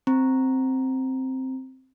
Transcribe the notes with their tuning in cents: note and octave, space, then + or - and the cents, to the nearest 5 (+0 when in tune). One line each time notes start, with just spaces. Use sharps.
C4 +0 A#5 +0